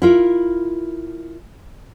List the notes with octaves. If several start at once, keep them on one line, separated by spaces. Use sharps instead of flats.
E4 F4 A#4